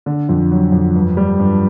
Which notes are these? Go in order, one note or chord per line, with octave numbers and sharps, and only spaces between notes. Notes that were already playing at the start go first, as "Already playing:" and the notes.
D3
F2
F#3
F2
G2
G3
G2